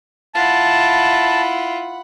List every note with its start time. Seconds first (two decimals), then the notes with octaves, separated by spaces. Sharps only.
0.35 E4 F4 F#5 A5 B5